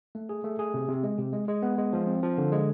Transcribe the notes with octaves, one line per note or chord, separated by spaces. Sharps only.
A3
G#4
A3
G#4
C3
C3
G#3
C3
G#3
G#3
B3
G#3
F3
C4
F3
D3
G#3